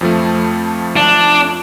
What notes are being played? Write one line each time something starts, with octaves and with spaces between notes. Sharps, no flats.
F2 F3 A3
D4